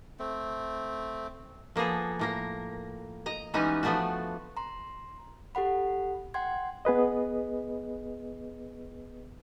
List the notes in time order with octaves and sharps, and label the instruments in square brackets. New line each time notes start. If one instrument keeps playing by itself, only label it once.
[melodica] A3 C4
[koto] F3 A#3 B3 G#4 A4
A2 A#3 A#4
D#5 A#5
E3 G3 G#3 B3 C#4 D#4
F3 A3 B3 D4 F#4
[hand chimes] A#5 C6
G4 A4 F#5 B5
F#5 G5 C6 G#6
[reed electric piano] B3 G#4 B4 D#5